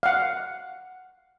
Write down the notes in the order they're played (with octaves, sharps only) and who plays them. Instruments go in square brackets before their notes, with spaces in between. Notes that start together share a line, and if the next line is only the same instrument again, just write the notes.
[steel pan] F5 F#5